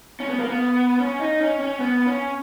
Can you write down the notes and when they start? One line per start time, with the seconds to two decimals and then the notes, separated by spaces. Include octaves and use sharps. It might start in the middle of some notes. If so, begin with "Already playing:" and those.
0.20 C#4
0.29 B3
0.40 A#3
0.49 B3
1.00 C#4
1.20 D#4
1.40 C#4
1.60 C#4
1.80 B3
2.07 C#4